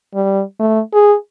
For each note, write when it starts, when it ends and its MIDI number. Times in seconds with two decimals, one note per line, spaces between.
0.14 0.42 55
0.59 0.80 57
0.93 1.15 68